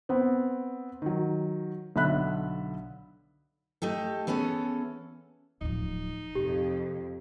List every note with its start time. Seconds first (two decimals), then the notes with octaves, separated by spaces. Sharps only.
0.09 B3 C4
1.02 D#3 F#3
1.96 B1 D3 E5 B5 F#6
3.82 A3 D#4 G4 A4
4.27 E3 B3 C#4 G#4 A4
5.61 D1 F3 D#4
6.35 F2 C3 G4